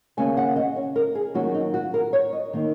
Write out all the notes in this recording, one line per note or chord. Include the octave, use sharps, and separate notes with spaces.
D#2 C#3 A#3 C#4 G#5
F#5
D#5
C#5
A#4
G#4
D#2 D#3 F#3 A#3 C#4 F#4
D#4
F#4
A#4
C#5
D#5
D#3 A#3 D#4